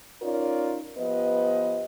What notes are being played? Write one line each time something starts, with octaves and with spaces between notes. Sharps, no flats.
C#4 D#4 F4 A#4 C#5 D5
F3 B3 G4 B4 D#5